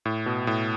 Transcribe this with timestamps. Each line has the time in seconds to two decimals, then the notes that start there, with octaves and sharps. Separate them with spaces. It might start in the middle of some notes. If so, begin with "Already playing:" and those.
0.05 A2
0.26 B2
0.47 A2